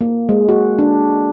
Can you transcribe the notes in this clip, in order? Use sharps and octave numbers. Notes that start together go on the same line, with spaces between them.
A#3
G#3
F#4
D4